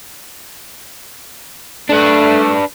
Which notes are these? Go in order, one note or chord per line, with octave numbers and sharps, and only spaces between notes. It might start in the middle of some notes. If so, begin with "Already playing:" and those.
A3 D4 B4